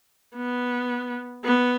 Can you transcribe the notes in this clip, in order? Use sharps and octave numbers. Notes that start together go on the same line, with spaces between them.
B3
B3